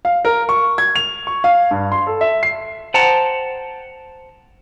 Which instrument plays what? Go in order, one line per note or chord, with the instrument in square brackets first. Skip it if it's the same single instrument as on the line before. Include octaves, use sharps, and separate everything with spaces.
[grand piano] F5
A#4
C#6
G#6
F7
C#6
F5
G2
C6
A4
E5
C7
[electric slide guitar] C5 F#5 G5 A5 A#5